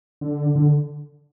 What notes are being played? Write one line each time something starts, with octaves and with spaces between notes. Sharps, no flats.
D3
D3